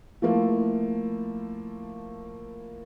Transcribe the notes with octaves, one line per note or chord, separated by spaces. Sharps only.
F3 A3 A#3 E4